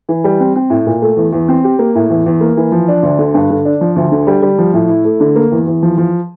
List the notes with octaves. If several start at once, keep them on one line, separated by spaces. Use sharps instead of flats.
E3
G3
C4
C4
A2
A#2
A3
E2
E2
C4
G4
A#3
A2
E2
E2
A#3
E3
F3
D4
D2
D3
G2
D3
D4
F3
D2
D3
G3
G3
F3
A2
E4
A3
D3
A#3
E2
E2
F3
F3